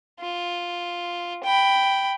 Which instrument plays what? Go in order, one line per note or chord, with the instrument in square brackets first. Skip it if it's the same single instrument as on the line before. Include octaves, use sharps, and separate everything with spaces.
[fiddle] F4
G5 B5